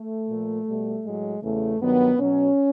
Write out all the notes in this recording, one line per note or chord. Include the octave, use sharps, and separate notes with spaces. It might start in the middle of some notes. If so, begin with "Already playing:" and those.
Already playing: A3
A#2 F3
B2 G3
A2 F#3 G#3
E2 C#3 E3 A3
G2 D#3 F#3 B3
B2 F#3 C#4